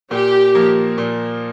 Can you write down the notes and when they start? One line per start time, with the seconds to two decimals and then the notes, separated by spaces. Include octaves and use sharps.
0.11 A#2 G4
0.55 F3 A#3
0.98 A#2